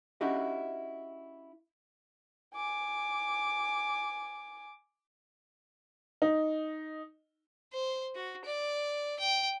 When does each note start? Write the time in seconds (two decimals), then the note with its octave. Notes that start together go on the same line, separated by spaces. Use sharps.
0.21 C#4 D4 E4 F#4 G4 D#5
2.54 G#5 D6
6.22 D#4
7.73 C5
8.15 F#4
8.45 D5
9.19 G5